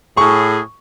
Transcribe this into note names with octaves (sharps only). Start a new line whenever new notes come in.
A2 G#4 C#6